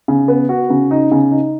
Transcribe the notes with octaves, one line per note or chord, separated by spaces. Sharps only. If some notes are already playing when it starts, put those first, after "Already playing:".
C#3
B3
F#4
C#3
D#4
C#3
D#4